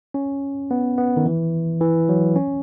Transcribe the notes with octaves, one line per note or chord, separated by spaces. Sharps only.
C#4
B3
B3
D#3
E3
E3
F#3
C#4